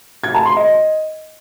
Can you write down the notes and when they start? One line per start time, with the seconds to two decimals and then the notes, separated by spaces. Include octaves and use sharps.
0.24 G#6
0.34 A5
0.45 C6
0.56 D#5